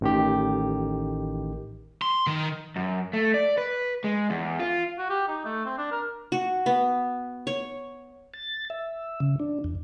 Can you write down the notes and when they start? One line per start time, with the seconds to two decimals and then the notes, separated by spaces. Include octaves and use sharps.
0.01 A1 D#3 G4
2.02 C6
2.27 D#3
2.76 F#2
3.13 A3
3.34 D5
3.58 B4
4.04 G#3
4.30 E2
4.60 F4
4.99 F#4
5.10 G4
5.28 D#4
5.45 A3
5.65 C4
5.78 D4
5.92 A#4
6.32 F#4
6.66 B3
7.47 C#5
8.34 A6
8.70 E5
9.20 C#3
9.40 D4
9.64 E2